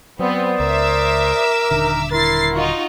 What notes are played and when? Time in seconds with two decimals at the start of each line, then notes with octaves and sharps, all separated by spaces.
0.19 F#3 B3 C4 C5 D5 D#6
0.60 C#2 A#4 E5 D6 E6
1.71 D#1 D3 D#4 A#5 F6
2.12 E4 A#4 C6 A6 C7
2.53 D#4 F4 F#4